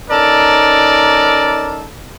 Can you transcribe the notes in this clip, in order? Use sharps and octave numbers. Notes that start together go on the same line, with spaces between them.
C#4 D#4 A4 A#4 D5